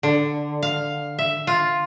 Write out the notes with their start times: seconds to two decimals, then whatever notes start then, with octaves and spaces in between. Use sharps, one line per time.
0.03 D3
0.62 F5
1.19 E5
1.47 F4